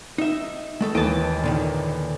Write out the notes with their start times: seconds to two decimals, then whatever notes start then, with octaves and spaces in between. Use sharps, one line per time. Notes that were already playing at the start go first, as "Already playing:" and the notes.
0.18 D#4 E5
0.81 G#3 A3 A4
0.95 D#2 E3 D#5 A5 D7
1.44 A#2 D3 D#3